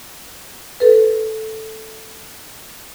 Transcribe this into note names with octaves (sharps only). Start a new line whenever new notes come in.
A4 B4